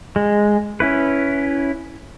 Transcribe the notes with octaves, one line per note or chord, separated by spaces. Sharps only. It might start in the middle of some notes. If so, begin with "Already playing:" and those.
G#3
C#4 E4 B4